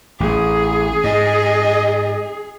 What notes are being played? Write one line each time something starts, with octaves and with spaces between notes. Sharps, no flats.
A1 G#4
G#2 D#5